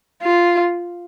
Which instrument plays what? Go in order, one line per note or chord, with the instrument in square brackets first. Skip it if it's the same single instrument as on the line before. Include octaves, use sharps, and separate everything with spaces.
[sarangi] F4